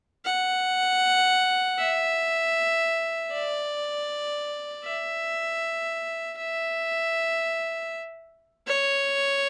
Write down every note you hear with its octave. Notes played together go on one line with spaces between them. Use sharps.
F#5
E5
D5
E5
E5
C#5